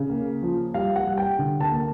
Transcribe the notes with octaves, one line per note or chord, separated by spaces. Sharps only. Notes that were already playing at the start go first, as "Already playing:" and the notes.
Already playing: C#3
A#3
F3
G3 F5
F#5
G3
G5
D3
A5
A#3